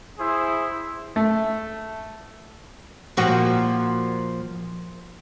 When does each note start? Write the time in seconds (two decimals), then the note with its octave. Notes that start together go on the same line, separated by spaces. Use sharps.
0.18 E4 G#4 C5
1.16 A3
3.17 A#2 F3 F#4